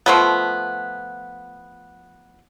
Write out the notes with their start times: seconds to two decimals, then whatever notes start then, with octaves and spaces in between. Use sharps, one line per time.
0.06 F3 A3 B3